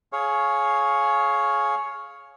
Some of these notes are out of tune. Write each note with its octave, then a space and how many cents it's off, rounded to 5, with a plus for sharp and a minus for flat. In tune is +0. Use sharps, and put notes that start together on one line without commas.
G#4 +20 C#5 +0 F5 +5